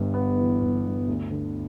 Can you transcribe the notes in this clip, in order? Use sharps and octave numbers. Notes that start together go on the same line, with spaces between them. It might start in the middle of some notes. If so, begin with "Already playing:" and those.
Already playing: G1 G2
B3
E3
G1
G2
D2
D3